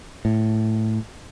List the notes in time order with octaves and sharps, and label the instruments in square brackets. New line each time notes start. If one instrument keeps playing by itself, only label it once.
[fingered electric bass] A2